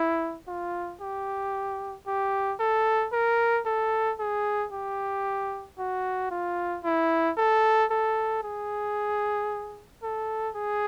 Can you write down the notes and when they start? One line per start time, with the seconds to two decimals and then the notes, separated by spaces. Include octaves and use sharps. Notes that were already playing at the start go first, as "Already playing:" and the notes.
Already playing: E4
0.48 F4
1.01 G4
2.07 G4
2.60 A4
3.13 A#4
3.66 A4
4.19 G#4
4.72 G4
5.78 F#4
6.31 F4
6.84 E4
7.37 A4
7.91 A4
8.43 G#4
10.03 A4
10.55 G#4